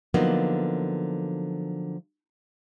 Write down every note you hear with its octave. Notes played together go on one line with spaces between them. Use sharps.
D3 F3 F#3 A#3 B3 D#4